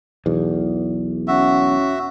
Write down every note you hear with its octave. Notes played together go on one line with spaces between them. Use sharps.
B1 E2
C#4 F#4 E5